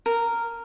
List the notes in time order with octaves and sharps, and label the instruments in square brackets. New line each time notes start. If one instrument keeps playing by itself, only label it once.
[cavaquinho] A#4